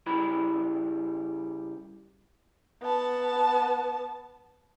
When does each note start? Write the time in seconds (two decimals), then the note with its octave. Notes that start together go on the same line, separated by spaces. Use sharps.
0.06 C#3 G3 E4 B5
2.82 B3 A5